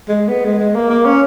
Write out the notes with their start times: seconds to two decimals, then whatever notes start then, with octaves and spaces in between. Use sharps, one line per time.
0.08 G#3
0.28 B3
0.45 G#3
0.59 G#3
0.75 A#3
0.90 A#3
1.05 C#4